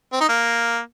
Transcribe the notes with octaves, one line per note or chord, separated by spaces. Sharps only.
C4
D#4
A#3